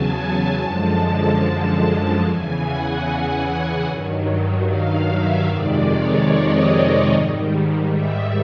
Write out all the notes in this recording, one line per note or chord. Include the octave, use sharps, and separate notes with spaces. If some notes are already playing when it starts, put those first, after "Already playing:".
Already playing: E2 C#3 F#3 G#5 A5
A5
F#2 D3 F3 G#3
E2 C#3 E3 G#5
F#5
F#5
G2 D#3 F#3
F5
E5
F2 C3 D#3 G#3 D5
C#5
D#5
G#2 D#3 G3
E5